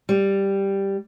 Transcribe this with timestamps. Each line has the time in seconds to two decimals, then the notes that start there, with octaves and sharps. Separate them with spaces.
0.09 G3